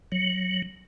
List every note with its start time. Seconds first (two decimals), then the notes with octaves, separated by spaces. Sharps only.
0.12 F#3